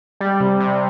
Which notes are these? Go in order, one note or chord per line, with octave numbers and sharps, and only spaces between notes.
G3
C3
C3